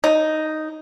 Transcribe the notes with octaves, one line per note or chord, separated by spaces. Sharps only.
D#4